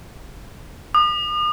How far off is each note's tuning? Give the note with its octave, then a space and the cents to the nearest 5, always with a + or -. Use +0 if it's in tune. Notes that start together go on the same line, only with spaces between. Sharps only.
D#6 -45